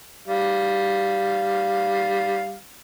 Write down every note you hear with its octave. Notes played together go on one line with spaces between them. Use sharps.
G3 F5